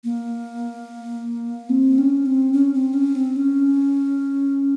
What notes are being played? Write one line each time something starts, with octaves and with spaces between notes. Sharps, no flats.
A#3
C4
C#4
C4
C#4
C4
C#4
C4
C#4